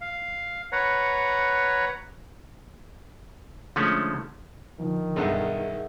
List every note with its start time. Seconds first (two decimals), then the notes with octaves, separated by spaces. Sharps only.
0.01 F5
0.72 B4 C#5 F#5 A#5
3.76 D3 F3 G#3 A3 C#4
4.80 D3 D#3 F3
5.16 B1 G2 G#4 A4 E5 F#5